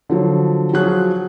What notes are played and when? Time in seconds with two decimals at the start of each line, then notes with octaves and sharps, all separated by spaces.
0.09 D3 F3 F#3
0.73 F3 F#3 F4 F#4 G#4 F#6